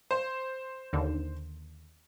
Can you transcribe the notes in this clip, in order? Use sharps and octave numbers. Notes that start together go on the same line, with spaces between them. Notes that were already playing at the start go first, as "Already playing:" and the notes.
C5
D#2 D3